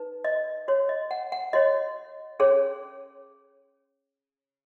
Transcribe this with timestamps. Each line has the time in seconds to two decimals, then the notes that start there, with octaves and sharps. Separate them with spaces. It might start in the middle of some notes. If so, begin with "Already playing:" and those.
Already playing: D#4 B4
0.24 D#5
0.68 F#4 C#5
0.89 D#5
1.11 F#5
1.32 F#5
1.53 F#4 C#5 D#5
2.40 C#4 G#4 C#5